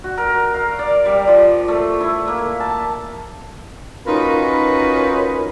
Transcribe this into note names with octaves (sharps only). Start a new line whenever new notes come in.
F#4
A#4
F5
D5
G3
F3
A3
E4
A#3
A5
C#4 D#4 F4 F#4 A#4 B4